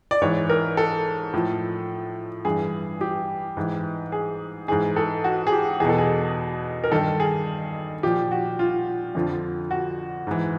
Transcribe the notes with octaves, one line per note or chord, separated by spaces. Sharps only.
D5
G#2 E3 C#5
A#4
A4
A2 F3
G2 E3 G#4
G4
G#2 E3
G#4
G#2 E3 G#4
A4
F#4
G#4
G4
E2 B2 G#4 A4
G#4
A#4
G2 D#3 A4
G#4
A#2 F3 G4
F#4
F4
F2 D3 F3
F#4
G#2 E3